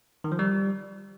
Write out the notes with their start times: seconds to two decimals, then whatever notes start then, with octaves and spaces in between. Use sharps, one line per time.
0.24 D#3
0.32 F3
0.39 G3